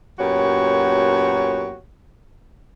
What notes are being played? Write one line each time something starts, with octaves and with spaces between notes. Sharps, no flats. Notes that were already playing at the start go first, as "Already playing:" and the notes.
F#2 A#2 B3 F#4 G4 C#5